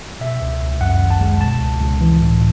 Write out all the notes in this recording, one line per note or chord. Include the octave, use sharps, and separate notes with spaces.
B2 E5
C#2
C#2
F#2 F#5
G#1
A5
G#3
B2 A5
C#2
C#2
E3
A2